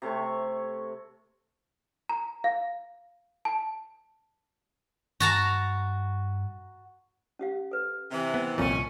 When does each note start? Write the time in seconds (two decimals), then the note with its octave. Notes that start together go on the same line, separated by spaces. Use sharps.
0.02 C3 A3 C#5 C#6
2.09 A#5
2.44 F5
3.45 A5
5.20 G2 F#4 A5 A#5
7.39 C#4 G4 F5
7.71 A4 B4
8.11 C3 E3
8.34 B3
8.58 C2 F2 A#2 C#4